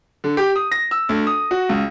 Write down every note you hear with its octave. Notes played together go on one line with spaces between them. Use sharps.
D3
G4
D#6
A#6
E6
D2
D#6
F#4
C#2